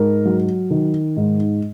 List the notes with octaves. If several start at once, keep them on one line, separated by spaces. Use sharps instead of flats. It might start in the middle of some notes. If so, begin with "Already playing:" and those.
Already playing: G#2 A#4
F#3
D#3
G#2